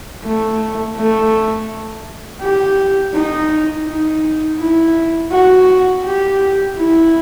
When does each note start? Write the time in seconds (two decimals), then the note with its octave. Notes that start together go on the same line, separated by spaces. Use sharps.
0.24 A3
0.96 A3
2.42 G4
3.14 D#4
3.87 D#4
4.59 E4
5.32 F#4
6.04 G4
6.77 E4